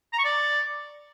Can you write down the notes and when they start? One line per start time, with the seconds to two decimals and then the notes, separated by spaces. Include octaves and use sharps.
0.13 A#5
0.19 C#6
0.24 D5